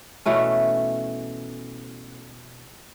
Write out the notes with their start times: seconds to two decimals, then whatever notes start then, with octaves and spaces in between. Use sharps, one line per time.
0.26 B2 E3 A3 C#4